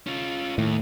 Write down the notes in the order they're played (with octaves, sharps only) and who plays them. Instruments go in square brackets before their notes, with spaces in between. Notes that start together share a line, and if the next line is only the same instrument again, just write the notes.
[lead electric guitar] C#4 F4
[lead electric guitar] D#2 [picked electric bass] A2